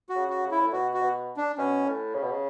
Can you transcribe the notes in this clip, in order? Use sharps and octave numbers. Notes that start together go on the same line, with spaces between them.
F#4
C#3
F#4
C#3
E4
A2
B2 F#4
F#4
B2
D4
B2 C#4
A2
C#3
B2
C#3